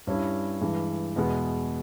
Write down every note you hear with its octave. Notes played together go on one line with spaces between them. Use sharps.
G2 G3 C#4 E4
G2 E3 G#3
E2 B2 G#3 B3